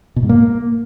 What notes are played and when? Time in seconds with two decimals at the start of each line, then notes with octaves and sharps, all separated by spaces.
0.16 B2
0.23 G#2
0.29 A#3